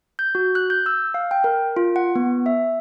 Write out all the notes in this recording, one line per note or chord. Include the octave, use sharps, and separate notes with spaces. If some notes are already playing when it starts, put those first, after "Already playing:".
G6
F#4
F#6
G6
E6
F5
G5
A#4
F4
F#5
B3
E5